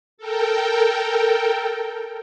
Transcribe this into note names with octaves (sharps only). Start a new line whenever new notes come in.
A4 A#4 G5